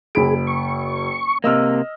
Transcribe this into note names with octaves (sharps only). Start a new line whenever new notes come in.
F#1 G#4 B5 D7
C#6
C3 A#3 D#5 E6 F6